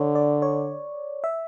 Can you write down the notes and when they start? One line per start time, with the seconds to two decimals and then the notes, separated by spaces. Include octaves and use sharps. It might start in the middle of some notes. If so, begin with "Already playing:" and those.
Already playing: D3 C#5
0.15 D5
0.42 C#5
1.24 E5